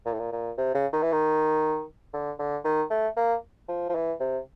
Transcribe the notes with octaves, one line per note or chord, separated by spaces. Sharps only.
A#2
A2
A#2
A#2
C3
C#3
D#3
E3
D#3
D3
D3
D#3
A3
A#3
F3
F3
E3
C3